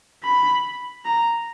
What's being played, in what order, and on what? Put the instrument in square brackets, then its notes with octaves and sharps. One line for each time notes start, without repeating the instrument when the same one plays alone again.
[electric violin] B5
A#5